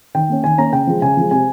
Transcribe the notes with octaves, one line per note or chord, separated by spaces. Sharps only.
D#3 G5
A#3 C#4
D#3 G#5
A#3 C#4 A#5
C#3 G5
F3 G#3
C#3 G#5
F3 G#3
C3 G#5